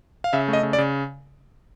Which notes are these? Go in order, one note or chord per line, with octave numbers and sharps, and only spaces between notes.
F5
C#3 E5
A3
D#5
C#3
D5
C#3